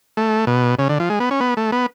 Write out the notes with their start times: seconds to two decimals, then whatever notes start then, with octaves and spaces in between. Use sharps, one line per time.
0.17 A3
0.47 B2
0.79 C#3
0.89 D3
1.00 F3
1.10 G#3
1.20 B3
1.31 C#4
1.40 B3
1.57 A3
1.72 B3